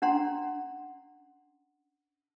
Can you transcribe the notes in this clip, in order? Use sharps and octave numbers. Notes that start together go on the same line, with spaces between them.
C#4 D4 F#5 A#5 C6